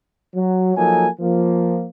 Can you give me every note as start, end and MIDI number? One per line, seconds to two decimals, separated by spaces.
0.35 0.75 54
0.76 1.07 53
0.76 1.07 54
0.76 1.07 58
0.76 1.07 63
0.76 1.07 69
0.76 1.07 80
1.20 1.86 53
1.20 1.86 58